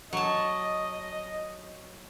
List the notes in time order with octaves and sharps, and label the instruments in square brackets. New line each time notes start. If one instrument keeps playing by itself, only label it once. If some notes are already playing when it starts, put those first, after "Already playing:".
[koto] F#3 A5 [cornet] D#5